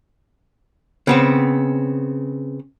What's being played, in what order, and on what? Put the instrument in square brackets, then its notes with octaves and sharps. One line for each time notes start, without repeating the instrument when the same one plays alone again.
[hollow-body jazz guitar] C#3 B3 C4